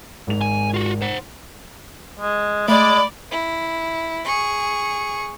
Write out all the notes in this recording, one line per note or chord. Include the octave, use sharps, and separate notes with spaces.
G#1 G#2 F7
G#5
F4 F#4
C5 F#5
G#3
G#3 A3 D5 B5
E4
G#4 C#6